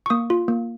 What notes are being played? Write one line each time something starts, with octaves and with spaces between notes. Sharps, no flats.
C#6
A#3 D#6
F4
A#3